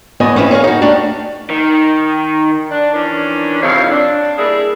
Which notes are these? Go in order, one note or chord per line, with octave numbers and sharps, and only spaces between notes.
E2 A2 B3 D#5 G#5
C4 C#4 E4 B4
G#4 C#5 D#5 F5
D#4 F#4
A3 D4 G4
D#3
D4
D#3 E3 C#4 D4
F2 C3 D#3 E4 C#5 F5
D4
G3 A#3 D4 E4 G#4